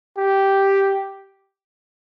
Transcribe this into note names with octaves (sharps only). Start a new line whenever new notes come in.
G4